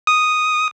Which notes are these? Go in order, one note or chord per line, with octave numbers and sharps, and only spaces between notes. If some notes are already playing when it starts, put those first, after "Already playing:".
D#6